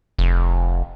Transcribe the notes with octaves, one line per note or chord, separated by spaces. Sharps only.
F1